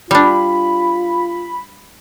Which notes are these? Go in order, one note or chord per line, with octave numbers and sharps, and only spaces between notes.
G3 D4 F4 B5